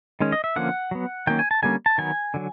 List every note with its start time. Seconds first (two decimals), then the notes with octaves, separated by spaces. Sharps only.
0.20 D#3 G#3 C#4
0.32 D#5
0.44 E5
0.56 D3 F3 A#3 C#4 F#5
0.91 F#3 B3
1.27 D#3 F#3 A#3 C#4 G5
1.39 G#5
1.51 A5
1.62 D3 G3 A#3 C#4 G#5
1.86 A5
1.98 D#3 F#3 B3 G#5
2.34 D3 F#3